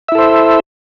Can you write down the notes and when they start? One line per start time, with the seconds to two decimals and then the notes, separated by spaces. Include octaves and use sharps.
0.09 E5
0.12 E4
0.15 A4
0.18 C5